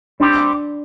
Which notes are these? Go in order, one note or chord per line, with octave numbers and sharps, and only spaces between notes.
G3 C4 D4 G4